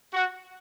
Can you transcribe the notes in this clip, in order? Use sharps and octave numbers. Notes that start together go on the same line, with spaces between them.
F#4